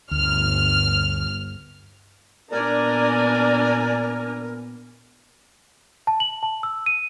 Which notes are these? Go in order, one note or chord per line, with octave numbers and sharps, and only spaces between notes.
G1 D2 F6
A#2 B3 D4 A#4 D5 G#5 A#5
A5
F#7
A5
E6
D#7